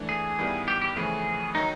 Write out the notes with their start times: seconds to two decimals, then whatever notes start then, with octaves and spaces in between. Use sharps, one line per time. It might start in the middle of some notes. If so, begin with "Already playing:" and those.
Already playing: E3 A3 D4
0.09 G#4
0.38 G2 D#3 G3 B3 E4
0.68 G4
0.82 G4
0.96 F2 C#3 E3 A3 C4 G#4
1.55 D#3 F#3 D#4